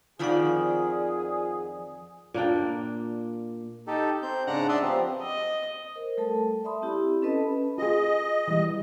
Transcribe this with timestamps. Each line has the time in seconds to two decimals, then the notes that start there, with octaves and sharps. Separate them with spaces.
0.19 F2 D#3 F3 F4 G#4 D5 F#5
2.34 A#2 A#3 D4 G5
3.87 D#4 G4 A4
4.22 C4 G6
4.47 G#2 C#3 D4 F#5 A#5 F#6
4.69 D5 E5 A5 C6 D#6 E6
4.83 F3 B3 C4 G4
5.22 D#5
5.96 A#4 C5
6.17 G3 A3 A4 A5
6.64 D5 E5 A5 B5 C6 D#6
6.82 C4 E4 G4
7.22 C#4 A4 B4 D#5 A5 B5
7.78 F4 G#4 D#5
8.48 E3 G3